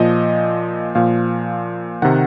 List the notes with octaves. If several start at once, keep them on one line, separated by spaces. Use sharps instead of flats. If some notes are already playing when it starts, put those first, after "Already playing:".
Already playing: A#2 F3 D#5
A#2 F3 F5
C3 D#3 F#5